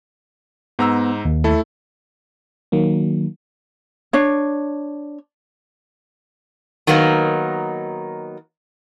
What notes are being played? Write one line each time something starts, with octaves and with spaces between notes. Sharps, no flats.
G#2 B3 A#5 E6
D#2
A3 E4 A4
D#3 F#3 A#3
D4 C#5
D#3 F#3 A#3 B3 D#4